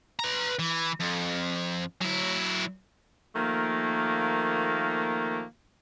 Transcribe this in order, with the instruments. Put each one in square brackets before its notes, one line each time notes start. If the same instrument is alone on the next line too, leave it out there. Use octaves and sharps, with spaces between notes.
[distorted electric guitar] B4 A#5
E3
F2
F#3 E4
[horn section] D#3 F3 A3 A#3